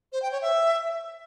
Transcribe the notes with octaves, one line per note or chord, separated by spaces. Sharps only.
C5
G5
C#5
E5